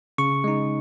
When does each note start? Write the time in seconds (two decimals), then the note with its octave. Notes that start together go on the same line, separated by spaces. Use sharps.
0.18 C#3 C#6
0.44 G#3 D#4